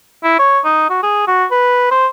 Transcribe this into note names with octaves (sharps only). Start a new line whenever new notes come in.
E4
C#5
D#4
F#4
G#4
F#4
B4
C5